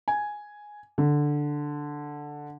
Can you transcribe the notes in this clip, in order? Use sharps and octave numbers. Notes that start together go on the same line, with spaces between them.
G#5
D3